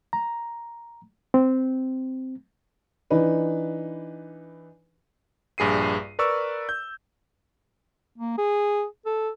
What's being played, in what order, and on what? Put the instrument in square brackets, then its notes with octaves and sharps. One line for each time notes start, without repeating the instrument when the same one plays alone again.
[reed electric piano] A#5
C4
[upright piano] E3 D4 D#4 B4
[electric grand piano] A#1 G2 G#4 C7 D#7
A#4 B4 D5 C#6 E6
G6
[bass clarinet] A#3
G#4
A4